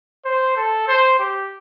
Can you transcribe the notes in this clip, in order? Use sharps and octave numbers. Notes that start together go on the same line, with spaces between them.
C5
A4
C5
G4